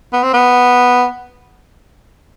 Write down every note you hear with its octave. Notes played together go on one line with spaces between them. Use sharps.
B3
C4
B3